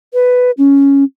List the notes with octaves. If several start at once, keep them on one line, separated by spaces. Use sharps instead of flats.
B4
C#4